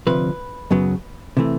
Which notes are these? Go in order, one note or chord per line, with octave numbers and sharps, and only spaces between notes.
D2 C3 F3 B4
F#2 C#3 F#3 B3
C3 E3 A3